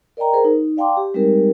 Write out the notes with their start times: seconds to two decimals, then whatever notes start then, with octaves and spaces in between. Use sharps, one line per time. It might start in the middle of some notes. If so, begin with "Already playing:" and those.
0.17 A#4 D5 D#5 G5 A#5
0.33 G#4 A#4 C5
0.44 D#4
0.77 D5 F5 G5 A5 C6 D6
0.97 G4
1.14 G3 G#3 C4 D#4 G4 A#4